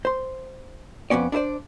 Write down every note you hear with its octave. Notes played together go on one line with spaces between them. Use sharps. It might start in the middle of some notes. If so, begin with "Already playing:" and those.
C5 C6
F2 A#2 B3 C#4 D5
D4 E4 G4 C5 D5